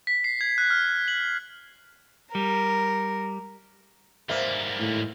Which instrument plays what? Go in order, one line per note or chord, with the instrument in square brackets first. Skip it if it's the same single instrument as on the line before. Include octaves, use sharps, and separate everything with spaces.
[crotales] B6
C7
G#6
F#6
F6
F#7
[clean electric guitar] G3 [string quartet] A#4
[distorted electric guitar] G#2 G3 [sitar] A#3 [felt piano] C5 E5
[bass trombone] A2